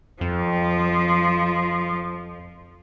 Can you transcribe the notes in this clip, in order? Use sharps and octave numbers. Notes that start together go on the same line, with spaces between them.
F2 F3